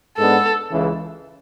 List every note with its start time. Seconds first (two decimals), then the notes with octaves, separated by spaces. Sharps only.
0.17 G#2 G#3 B3 D4 A4
0.70 C#2 C#3 E3